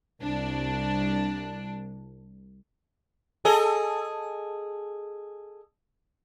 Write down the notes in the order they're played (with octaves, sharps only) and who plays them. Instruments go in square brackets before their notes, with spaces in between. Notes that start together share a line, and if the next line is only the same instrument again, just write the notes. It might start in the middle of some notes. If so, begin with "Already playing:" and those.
[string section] C2 D4
[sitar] G#4 A4 D#5